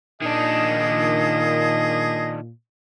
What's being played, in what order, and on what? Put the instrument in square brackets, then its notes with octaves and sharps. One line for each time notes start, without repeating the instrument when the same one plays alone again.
[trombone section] A#2 [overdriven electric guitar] D#3 D4 [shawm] G#4 [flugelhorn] D#5